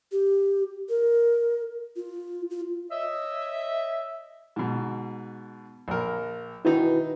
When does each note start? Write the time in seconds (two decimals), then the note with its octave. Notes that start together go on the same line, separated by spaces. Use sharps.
0.12 G4
0.89 A#4
1.96 F4
2.50 F4
2.91 C#5 D#5 E5
4.56 G#2 B2
5.88 A#1 A#4
6.65 D#3 D#4 E4 F#4 B4